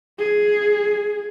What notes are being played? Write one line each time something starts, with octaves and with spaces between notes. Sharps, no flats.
G#4